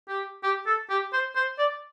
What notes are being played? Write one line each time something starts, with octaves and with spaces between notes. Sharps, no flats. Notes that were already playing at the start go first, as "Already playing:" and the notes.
G4
G4
A4
G4
C5
C5
D5